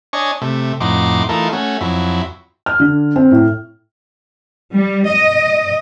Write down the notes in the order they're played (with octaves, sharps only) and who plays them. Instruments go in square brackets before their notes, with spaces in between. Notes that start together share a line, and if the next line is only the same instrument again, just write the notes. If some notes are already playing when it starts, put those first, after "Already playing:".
[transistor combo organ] D4 C#5 D#5 G#5 C#6
C3 A3
F2 A2 D#4 F#4 C6 D6
E3 A3 D#4 F4 A4 A#4
A3 C#4 F#4
F2 F#3 E4
[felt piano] F6
D3
C4
A2
[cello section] G3
D#5